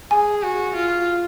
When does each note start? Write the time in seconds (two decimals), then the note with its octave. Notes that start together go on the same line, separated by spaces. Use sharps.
0.11 G#4 G#5
0.43 F#4
0.76 F4